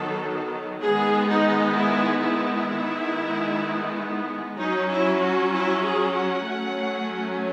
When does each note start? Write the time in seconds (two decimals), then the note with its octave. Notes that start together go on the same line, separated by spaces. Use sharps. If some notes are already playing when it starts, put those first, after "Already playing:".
Already playing: D#3 F#3 B3 A4
0.83 D#3 G#3 B3 G#4
1.31 D#4
1.77 E4
2.23 E4
2.71 D#3 G#3 B3
4.58 F#3 C#4 D#4
4.91 E4
5.22 F#4
5.54 E4
5.85 G#4
6.16 F#5
6.47 F#3 A3 C#4